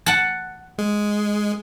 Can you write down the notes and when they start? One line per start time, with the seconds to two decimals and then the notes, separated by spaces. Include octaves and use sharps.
0.06 F#5 A5
0.78 G#3